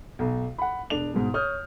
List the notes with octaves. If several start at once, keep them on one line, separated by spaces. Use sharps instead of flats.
B1
F#5 B5
E1 D4 F7
G#2 B2
C#5 D#6 F6 G6